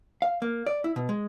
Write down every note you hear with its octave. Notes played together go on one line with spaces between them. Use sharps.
F5
A#3
D5
E4
B2
G#3